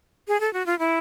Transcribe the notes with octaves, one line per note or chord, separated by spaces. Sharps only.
G#4
A4
F#4
F4
E4